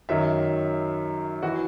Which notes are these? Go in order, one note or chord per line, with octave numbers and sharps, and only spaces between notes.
F#2 D#3 F#3 E5
E3 F#4